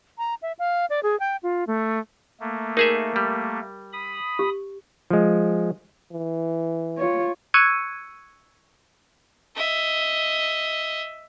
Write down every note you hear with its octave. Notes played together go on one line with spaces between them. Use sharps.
A#5
E5
F5
D5
G#4
G5
F4
A3
A3 A#3
D#4 G#4 A#4 E5
G3
B5 D#6
G4
F3 G#3
E3
F4 C#5
C#6 E6 F#6 G#6 C#7 D#7
D#5 E5